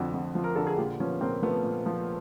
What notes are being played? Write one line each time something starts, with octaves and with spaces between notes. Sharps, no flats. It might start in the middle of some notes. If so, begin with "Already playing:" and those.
Already playing: F2 D3 F3 F#4
F2
F3
A#4
D3 A4
G#4
A#2 F4 G4
F3 B3 C#4
A#2 A#3 C4
F3 A3 B3
A#2
F3